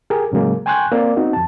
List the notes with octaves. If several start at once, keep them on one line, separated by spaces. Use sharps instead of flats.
G4 G#4 A#4
A2 C#3 F#3 G#3 A#3
G5 G#5 C6 C#6 F#6 G6
A#3 C4 D5
B3 C4 D#4 F#4
F2 A5